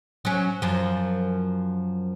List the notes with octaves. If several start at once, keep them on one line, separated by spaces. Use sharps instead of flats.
F#3 C#4
F#2 F3